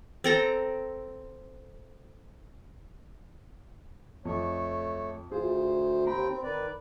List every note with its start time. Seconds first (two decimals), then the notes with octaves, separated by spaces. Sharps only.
0.24 C4 A4 A#5
4.25 F2 A3 C#5
5.32 D2 F4 G#4 C5
6.07 D#2 C4 G5 A#5 B5
6.30 C4
6.44 D#3 B4 D5